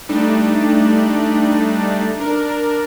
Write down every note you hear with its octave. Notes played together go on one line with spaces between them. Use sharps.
G3 A3 D4 D#4
D4 A#4